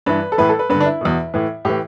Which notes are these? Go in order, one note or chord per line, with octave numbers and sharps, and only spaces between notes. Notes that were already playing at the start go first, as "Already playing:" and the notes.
G2 E3 B4
A4
A2 E3 B4
A4
B4
G2 D3 B4
D4
E4
E2 B2
A2 E3
A2 E3 G4